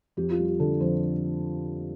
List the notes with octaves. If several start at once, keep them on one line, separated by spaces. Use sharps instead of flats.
F2 G4
F4
G3
G4
D3 A4
F2 C5